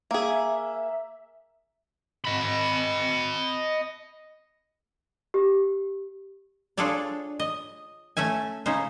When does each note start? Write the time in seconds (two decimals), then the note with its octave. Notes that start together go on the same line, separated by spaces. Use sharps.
0.11 A#3 G#4 E5
2.25 D#5 B5
5.34 G4
6.77 D4 F4 G#4 A4 C#5 D5
7.40 D#5
8.17 A3 C#4 E5 G#5
8.66 C#3 C#4 D#4 C5